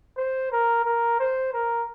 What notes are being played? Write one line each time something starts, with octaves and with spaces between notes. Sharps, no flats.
C5
A#4
A#4
C5
A#4